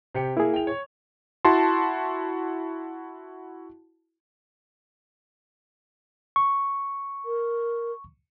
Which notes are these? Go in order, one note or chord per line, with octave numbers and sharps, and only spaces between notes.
C3 G4 C#7
A#3 E4 G#4
G5 F7
C#5
E4 F#4 A5 C6
C#6
A#4